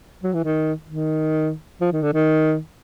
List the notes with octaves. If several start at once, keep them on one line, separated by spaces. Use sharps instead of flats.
F#3
E3
D#3
D#3
F3
D#3
D3
D#3